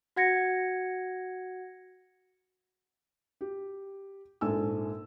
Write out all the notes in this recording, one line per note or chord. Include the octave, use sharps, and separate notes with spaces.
F#4 F#5 G#6 A#6 C#7
G4
A#1 G#2 A4 G#5 E6